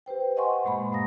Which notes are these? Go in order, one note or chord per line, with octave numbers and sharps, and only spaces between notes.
G4 B4 C5 G5
D#5 F#5 G#5 C6 C#6
G2 A#2 G#3 A#3 B5
G#3 F5 A#5 D#6 A#6